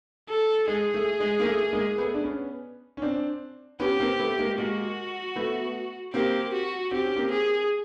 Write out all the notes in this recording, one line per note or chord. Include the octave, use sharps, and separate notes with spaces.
A4
G#3 G#4
A3
G#3
A#3
A3
G#3 A#3
A3 B3
D4
B3 C#4
C#4
C4 D4
B3 C#4 G4
A#3 C4
A3 B3
G#3 A#3
G#3 A#3 F#4
A3 B3
A#3 C4 G4
F#4
C4 G4
C#4
A#3 C4
G#4